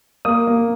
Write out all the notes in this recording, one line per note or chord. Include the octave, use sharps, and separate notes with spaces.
A#3 D#6
A#3